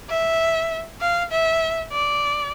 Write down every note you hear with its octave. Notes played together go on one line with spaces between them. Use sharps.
E5
F5
E5
D5